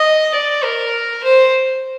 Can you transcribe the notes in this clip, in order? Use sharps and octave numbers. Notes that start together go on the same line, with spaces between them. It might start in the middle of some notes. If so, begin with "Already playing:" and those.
Already playing: D#5
D5
A#4
C5